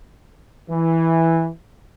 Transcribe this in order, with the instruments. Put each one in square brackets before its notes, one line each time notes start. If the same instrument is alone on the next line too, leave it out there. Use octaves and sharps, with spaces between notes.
[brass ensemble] E3